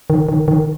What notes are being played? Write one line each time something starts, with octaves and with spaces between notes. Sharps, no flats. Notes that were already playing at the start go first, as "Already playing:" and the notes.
D#3
D#3
D#3